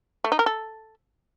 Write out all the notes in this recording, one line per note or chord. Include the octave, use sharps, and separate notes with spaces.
A3
D#4
A#4
A4